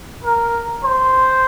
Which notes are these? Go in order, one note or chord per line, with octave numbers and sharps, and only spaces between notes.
A#4
C5